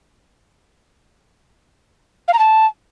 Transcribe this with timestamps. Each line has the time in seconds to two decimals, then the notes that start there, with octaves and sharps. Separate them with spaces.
2.28 F5
2.33 A#5
2.39 A5